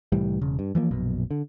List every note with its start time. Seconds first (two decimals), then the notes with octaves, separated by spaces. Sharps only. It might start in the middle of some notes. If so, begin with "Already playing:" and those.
0.12 C2 A2 E3 G3
0.42 E1 C#3
0.59 G2
0.75 E3 F3 A#3
0.91 A#1 F#2 B2
1.31 D3